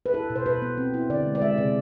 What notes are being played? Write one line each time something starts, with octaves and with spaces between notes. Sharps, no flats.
B4
E4 A4
B2
C5
B2 B4
B3
C4
E4
D3 D5
G#3
D5
G#3 E5
C3 D5